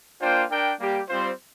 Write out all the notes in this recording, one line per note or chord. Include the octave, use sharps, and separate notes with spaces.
A#3 D4 F4 C5 G5
D4 A#4 G5
G3 A#3 G4
G3 C4 F4 C5